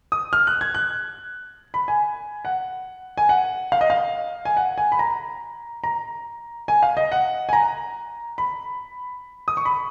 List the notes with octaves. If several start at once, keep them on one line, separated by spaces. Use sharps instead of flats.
D#6
F6
F#6
G#6
F#6
B5
G#5
F#5
G#5
F#5
F5
D#5
F5
G#5
F#5
G#5
B5
A#5
A#5
G#5
F5
D#5
F#5
G#5
A#5
B5
D#6
C#6
B5